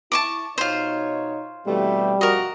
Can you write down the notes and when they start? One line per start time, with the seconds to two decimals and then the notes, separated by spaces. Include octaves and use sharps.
0.12 E4 A5 C#6 D6
0.58 B2 D#4 F4 C5 C#5
1.67 B2 E3 G3 A3 C4 G4
2.21 F#2 B2 F3 F#4 A#4 D#5